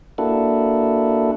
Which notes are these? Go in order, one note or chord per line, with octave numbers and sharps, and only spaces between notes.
A#3 D4 E4 F#4 A4